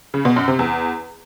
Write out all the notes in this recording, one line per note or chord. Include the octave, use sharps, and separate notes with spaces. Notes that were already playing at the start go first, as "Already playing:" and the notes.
C#3
B2
F#2
C3
E2